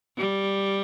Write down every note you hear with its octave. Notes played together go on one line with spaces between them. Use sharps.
G3